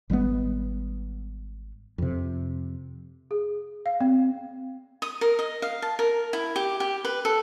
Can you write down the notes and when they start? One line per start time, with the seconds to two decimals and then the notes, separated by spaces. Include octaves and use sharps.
0.10 G#1 G3 G#3 B3
1.98 F2 C3
3.31 G#4
3.86 F5
4.01 C4
5.02 D#6
5.21 A#4
5.39 D#5
5.62 F5
5.82 A5
5.99 A#4
6.33 E4
6.56 G4
6.80 G4
7.05 B4
7.25 A4